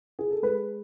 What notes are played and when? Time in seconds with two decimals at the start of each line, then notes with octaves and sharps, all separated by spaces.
0.19 G#4
0.31 A4
0.42 G#3 B4